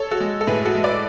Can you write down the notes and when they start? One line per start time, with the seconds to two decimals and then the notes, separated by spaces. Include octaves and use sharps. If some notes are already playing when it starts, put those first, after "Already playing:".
Already playing: A4 C#5
0.11 F#4 A4
0.20 G#3
0.41 A4
0.47 A2 G#4 B4
0.65 F#4 A4
0.75 G#3
0.84 B4 D5